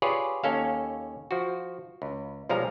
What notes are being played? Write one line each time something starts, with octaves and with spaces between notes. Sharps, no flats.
F4 G4 G#4 B4 C#5 D5
D#2 A#3 C#4 A4 F5
F3 F#4
C#2
B1 F3 G3 G#3 F5 A#5